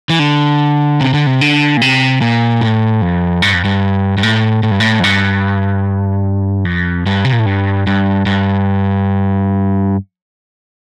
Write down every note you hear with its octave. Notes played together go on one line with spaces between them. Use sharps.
E3
D3
C3
D3
C3
D3
A#2
C3
A#2
A2
F2
G2
F2
G2
G2
A2
A2
G2
A2
F2
G2
F2
G2
C3
A#2
A2
G2
G2
G2